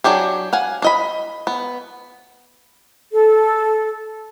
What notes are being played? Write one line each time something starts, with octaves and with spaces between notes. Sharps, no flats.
F#3 D4 G4 G#4
F5 F#5 G#5
D4 D#5 B5
B3
A4